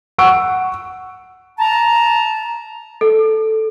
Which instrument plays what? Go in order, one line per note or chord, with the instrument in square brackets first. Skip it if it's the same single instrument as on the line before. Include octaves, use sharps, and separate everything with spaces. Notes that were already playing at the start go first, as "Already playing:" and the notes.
[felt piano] F#5 C#6 E6 D7
[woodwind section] A5 A#5
[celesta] A4